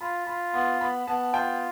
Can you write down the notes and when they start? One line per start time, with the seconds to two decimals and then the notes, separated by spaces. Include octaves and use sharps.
0.01 F4 B5
0.27 F4 B5
0.53 B3 C6
0.81 B3 B5
1.07 B3 A5
1.34 F4 G5